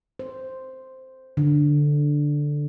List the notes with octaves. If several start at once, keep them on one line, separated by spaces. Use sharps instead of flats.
C5
D3